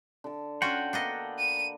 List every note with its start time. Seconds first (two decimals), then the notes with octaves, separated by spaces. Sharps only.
0.24 D3 A5
0.62 C#4 F4 F#4 F#5 G5
0.93 A#3 B3 D4 A4 D#5 A#5
1.39 D#7